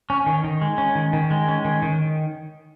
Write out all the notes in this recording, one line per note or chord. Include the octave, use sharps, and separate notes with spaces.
C#4
D#3
D#3
G#3
C#4
D#3
D#3
G#3
C#4
D#3
D#3